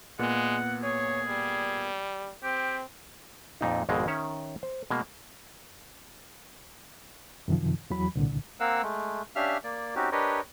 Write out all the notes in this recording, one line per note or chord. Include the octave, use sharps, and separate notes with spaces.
A#2 G#3 A#3 B3 F#5
G#4 C#5
G3
C4 G4
F2 A#2 D#4
G#1 F2 B2 G#3 C4
D#3 C#4 C#5 E5
C5
B2 G#3 A#3
F#2 C3 D#3 F3
E2 E3 F#3 B5
C2 A#2 D3
A#3 C4 A#4 F5 F#5 E6
G#3 A3
C#4 D4 G4 E5 F5 F6
A#3 D5
C4 C#4 D#4 F#4 G4
D4 G4 A#4 B4 C#5 D#5